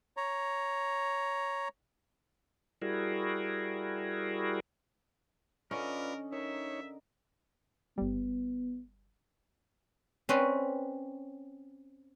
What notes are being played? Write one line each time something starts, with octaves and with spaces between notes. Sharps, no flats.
C#5 A#5
G3 E4 F#4 G#4 A#4
D3 C#4 F4 A#4 B4 D5 D#5
D#4 A#4 C#5 E5
G1 G3 B3
C4 C#4 B4 C#5 D5